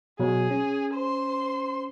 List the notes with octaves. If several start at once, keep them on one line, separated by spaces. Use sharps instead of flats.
B2 F#3 G#4
C#4
C5 C6